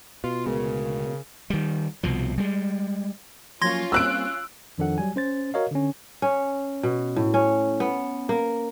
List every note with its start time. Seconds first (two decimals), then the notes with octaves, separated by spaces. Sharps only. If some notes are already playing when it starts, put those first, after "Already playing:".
0.24 B2 F4
0.46 D2 C#3 G#3 B3 A#4
1.50 D#3 G3
2.03 C2 B2 F3
2.38 G3 G#3
3.62 F3 F#3 A#3 C#4 F4 C6 G#6 A#6
3.92 G3 A#3 C4 E6 F#6 D7
4.78 F2 D#3 F3 D4 A4 F#5
4.98 F#3 G3 G#5
5.16 C#4 C5 A6
5.54 F#4 A#4 C#5 D#5 F5
5.71 D3 C#4
6.22 C#4
6.83 B2
7.16 A2
7.34 C#4
7.80 B3
8.29 A#3